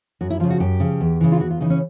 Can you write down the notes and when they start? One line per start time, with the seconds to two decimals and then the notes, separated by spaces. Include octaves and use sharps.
0.21 F#2 F#4
0.30 E4
0.40 F3 F4
0.43 C#3
0.50 F#4
0.60 F#2 G4
0.80 C#3 F3
1.01 E2
1.21 C#3 E3
1.32 F4
1.40 E2 F#4
1.50 F4
1.60 C#3 E3 D#4
1.70 C#4